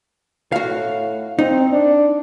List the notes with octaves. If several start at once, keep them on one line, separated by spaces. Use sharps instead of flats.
A2 F#4 F5
C4 D#4
D4